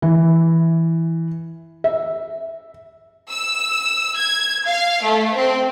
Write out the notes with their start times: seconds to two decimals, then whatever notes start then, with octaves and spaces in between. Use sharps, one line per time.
0.02 E3
1.84 E5
3.30 E6
4.17 G#6
4.66 F5
5.03 A3
5.35 C4